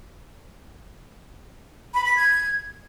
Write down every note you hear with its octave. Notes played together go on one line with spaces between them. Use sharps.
B5
B6
G#6